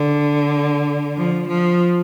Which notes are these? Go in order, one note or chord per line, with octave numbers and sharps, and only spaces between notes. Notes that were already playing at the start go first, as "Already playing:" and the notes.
Already playing: D3
F3
F3